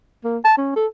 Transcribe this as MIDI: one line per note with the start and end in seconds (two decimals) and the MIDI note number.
0.25 0.38 58
0.45 0.53 81
0.58 0.73 61
0.76 0.86 69